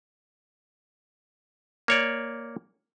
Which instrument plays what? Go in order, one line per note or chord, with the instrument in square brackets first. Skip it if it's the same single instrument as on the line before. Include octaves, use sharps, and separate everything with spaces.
[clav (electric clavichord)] A#3 C#5 D5